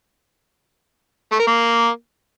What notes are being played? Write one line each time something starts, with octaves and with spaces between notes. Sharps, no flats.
A3
A#4
A#3